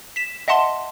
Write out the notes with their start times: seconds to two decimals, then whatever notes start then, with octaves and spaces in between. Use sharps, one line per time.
0.16 B6 E7
0.48 D#5 E5 F#5 A5 C6